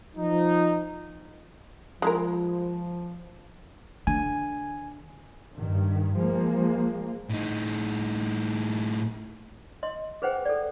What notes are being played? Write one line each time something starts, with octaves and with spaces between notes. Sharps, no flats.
F3 D#4
F3 G#3 E4 A#4
D3 G#5
G2 D#3
F3 G#3 A#3
A2 D#4
D#5 C6
G#4 B4 C5 F#5 G5
A4 D5